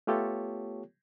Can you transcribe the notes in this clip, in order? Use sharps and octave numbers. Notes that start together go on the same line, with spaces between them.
A3 B3 F4 G4 A4 C#5